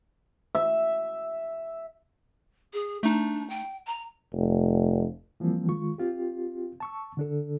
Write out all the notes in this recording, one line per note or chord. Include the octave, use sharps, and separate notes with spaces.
E5
G#4
A3 D4 D#4
G5
A#5
F1
E3 F3 G3 A#3 C4
D#3 G#3 F4 C#6
C4 F4 G4
A5 C#6 E6
D3 D4 A4